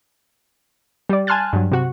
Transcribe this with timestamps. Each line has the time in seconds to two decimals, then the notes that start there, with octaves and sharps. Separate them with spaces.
1.09 G3 D5
1.27 G#5 A5 C6 F6 F#6 A6
1.53 G2 F#3
1.72 C3 F#4